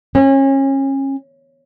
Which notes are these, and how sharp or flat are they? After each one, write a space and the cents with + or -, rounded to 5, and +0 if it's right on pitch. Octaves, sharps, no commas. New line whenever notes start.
C#4 -30